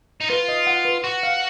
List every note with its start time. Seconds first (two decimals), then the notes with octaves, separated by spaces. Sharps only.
0.21 D#4
0.30 F4 B4
0.49 D#5
0.67 F#5
0.85 B4
1.04 F#4 C#6
1.23 F5